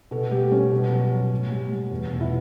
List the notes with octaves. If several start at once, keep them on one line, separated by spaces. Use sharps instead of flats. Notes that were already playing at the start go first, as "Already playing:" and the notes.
B2 A4
G3 G4
G3 C#4
B2
F#3
F#3
A2
G3
G3
E2
B2
E4